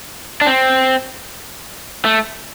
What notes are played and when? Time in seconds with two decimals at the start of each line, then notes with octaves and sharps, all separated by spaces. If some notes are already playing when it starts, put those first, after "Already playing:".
0.41 D4
0.47 C4
2.05 A3